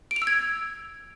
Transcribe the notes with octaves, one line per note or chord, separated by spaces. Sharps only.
D7
F7
E6
G#6